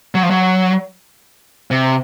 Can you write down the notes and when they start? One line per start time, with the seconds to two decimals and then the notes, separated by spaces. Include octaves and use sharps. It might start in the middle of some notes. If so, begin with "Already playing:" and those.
0.15 F#3
0.23 F3
0.30 F#3
1.71 C3